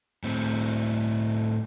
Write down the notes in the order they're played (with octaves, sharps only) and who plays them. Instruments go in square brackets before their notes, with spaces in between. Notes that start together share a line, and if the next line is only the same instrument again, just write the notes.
[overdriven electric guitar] A2 C4